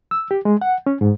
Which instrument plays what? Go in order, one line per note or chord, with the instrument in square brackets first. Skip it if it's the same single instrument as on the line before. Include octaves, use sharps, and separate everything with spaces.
[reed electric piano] E6
G4
G#3
F#5
C#4
G#2